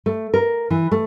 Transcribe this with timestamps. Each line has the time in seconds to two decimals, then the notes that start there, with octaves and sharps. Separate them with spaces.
0.06 A3
0.34 A#4
0.70 E3
0.91 A3